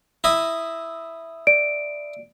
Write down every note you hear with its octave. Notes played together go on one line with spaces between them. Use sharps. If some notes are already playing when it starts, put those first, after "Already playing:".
E4 D#5
D5 D7